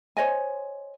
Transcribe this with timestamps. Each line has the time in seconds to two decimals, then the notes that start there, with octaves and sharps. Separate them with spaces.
0.17 C5 C#5 D#5 G#5